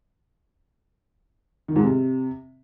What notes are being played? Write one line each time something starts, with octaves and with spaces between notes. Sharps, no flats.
D#3
G#2
C3